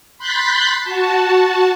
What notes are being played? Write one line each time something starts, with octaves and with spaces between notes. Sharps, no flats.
B5 C6 F#6 G6 A6 B6
F#4 A5